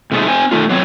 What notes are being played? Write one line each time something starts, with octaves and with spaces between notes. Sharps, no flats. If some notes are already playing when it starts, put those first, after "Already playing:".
C3 G#3 A3 B3 D#4
C4 C5 G#5
D#3 A3 F4
F#3 B3 C4 C#5